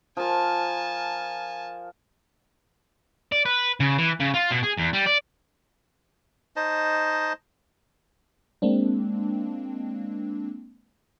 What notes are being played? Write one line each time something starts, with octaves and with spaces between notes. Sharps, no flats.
F3 A#4 G#5 A5
D5
B4
C#3
E3
C#3
F4
B2
G#4
E2
G3
D5
D#4 C5 D#5 A5
G#3 A#3 C4 D4